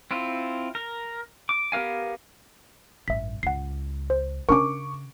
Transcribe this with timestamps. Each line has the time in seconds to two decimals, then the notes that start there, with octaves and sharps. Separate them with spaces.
0.11 C4 E4 F4
0.75 A#4
1.49 D6
1.72 B3 G4 A#4 F5 G#5
3.08 A1 G2 E5 B6
3.43 C#2 F#5 C7
4.10 C5
4.49 C#3 C#4 D4 A#4 C#6 D6